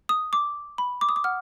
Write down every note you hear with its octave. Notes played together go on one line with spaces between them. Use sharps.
D#6
D6
B5
D6
D#6
D6
F#5 F6